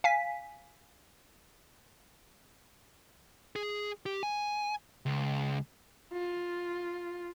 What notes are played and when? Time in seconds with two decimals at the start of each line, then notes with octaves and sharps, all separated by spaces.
0.04 F5 G#5 B6
3.56 G#4
4.06 G4
4.23 G#5
5.06 C#2
6.12 F4